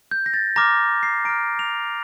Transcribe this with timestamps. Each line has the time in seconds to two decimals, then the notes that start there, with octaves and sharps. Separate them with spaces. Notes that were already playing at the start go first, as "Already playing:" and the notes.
0.11 G6
0.26 A#6
0.34 A6
0.56 A#5 D6 F6 A#6
1.03 C7
1.25 A#5 F6 D7
1.59 F7